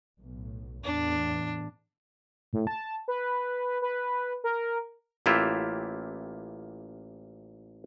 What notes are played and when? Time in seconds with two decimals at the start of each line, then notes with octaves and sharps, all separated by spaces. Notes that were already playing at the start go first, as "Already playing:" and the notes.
0.20 B1 A2
0.84 E2 A2 D4
2.53 A2
2.67 A5
3.08 B4
3.82 B4
4.44 A#4
5.26 A1 A#3 E4 F4 G4 E5